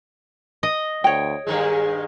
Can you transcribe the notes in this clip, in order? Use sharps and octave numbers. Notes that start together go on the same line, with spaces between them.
D#5
D2 C#5 G5
G2 D#3 G#3 G#4